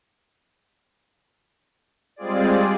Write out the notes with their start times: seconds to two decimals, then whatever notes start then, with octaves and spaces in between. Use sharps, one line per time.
2.16 G3 G#3 C4 F4 G#4 D5